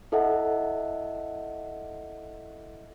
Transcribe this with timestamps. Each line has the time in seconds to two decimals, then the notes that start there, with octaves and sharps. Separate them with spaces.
0.12 E4 A4 D#5 E5 F#5